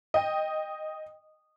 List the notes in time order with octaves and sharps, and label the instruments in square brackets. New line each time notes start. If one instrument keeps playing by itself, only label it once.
[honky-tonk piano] D#5 G5